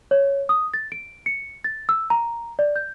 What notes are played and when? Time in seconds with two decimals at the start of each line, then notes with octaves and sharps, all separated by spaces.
0.11 C#5
0.49 D#6
0.74 A6
0.92 D7
1.26 C#7
1.64 A6
1.89 E6
2.10 A#5
2.59 D5
2.76 G6